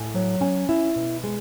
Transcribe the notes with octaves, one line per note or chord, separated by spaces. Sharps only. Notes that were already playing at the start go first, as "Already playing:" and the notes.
Already playing: A2 G#5
F#3
C#4 G#5
E4
B2
G#3